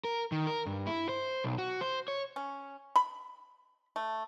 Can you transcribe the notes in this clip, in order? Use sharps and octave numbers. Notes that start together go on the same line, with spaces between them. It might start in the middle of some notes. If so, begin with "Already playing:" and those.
A#4
D#3
A#4
G2
E4
C5
B1
F#4
C5
C#5
C#4
B5
A3